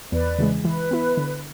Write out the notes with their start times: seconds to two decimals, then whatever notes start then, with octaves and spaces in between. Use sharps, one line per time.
0.12 E2 B4 D5
0.39 C#3 E3 G#3
0.64 E3 B4
0.91 B3 E4
1.17 D3